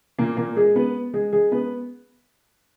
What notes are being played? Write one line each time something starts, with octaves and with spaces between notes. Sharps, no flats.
A#2 A#3
A#2 A#3
G#3 G#4
B3 B4
G#3 G#4
G#3 G#4
B3 B4